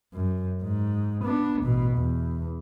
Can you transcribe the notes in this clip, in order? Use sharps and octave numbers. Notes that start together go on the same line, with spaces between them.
F#2
G#2
B3 D4
A1 B2
E2